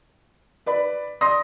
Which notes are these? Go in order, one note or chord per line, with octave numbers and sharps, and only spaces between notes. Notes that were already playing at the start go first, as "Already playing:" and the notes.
B4 D5 B5
D5 C6 D#6 A#6